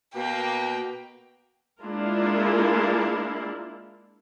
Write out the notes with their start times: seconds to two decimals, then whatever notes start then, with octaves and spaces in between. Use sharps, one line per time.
0.16 B2 A#3 G5
1.82 G#3 A#3 D4 E4 F4 A#4